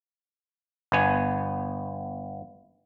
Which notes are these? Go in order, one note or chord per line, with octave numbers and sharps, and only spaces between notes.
G1 B3 G#5